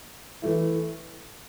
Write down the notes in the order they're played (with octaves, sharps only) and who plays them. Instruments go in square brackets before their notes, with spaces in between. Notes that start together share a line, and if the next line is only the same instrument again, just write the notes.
[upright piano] E3 A3 E4